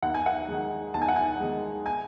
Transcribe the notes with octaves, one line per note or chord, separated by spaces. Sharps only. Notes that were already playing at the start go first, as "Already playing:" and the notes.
D#2 F#5
G#5
F#5
D#3 G#3
D#2 A5
G#5
F#5
G#5
D#3 G#3
G#5